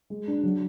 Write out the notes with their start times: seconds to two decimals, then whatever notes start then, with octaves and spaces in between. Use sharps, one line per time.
0.10 G#3
0.27 D4
0.43 F#3